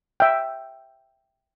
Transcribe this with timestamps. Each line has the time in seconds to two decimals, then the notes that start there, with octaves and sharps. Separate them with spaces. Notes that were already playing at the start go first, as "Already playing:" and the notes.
0.20 E5 G5